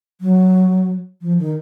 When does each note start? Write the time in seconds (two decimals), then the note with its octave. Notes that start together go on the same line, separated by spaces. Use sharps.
0.21 F#3
1.21 F3
1.39 D#3